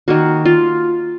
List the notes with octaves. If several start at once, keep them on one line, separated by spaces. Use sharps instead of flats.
D#3 A#3 F#4
F4